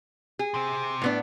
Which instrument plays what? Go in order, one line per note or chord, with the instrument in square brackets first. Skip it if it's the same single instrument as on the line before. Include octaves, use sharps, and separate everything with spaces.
[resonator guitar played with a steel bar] G#4
[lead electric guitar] C3 C4
[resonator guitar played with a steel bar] A2 B3 D4